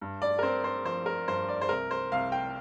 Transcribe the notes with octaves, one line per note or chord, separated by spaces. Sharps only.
G2
D5
A#4
C4 C5
C5
F3 C5
A#4
G2 C5
D5
C5
C2 A#4
C5
C2 F5
G5